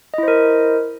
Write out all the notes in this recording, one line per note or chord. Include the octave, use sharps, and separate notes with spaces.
E4 A#4 C5 D#5